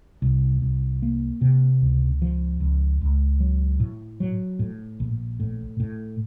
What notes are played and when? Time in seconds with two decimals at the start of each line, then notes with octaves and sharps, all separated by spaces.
0.22 C2
0.62 C2
1.02 A#3
1.41 C3
1.81 C#2
2.22 F3
2.60 C#2
3.01 C#2
3.40 F#3
3.80 A2
4.20 F#3
4.59 A2
5.00 A#1
5.40 A2
5.80 A2